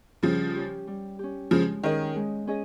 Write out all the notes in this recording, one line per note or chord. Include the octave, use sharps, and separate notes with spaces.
C#3 F3 G3
C#4 G4
G3
C#4 G4
C#3 F3 G#3
D#3 C#4 G#4 D#5
G#3
C#4 G#4 D#5